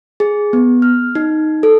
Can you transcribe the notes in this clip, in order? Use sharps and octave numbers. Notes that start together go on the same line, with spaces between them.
G#4
B3
F6
D#4
A4